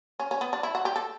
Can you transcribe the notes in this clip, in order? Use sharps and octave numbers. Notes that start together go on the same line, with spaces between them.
C#4
C#4
B3
D4
E4
F#4
G4
A4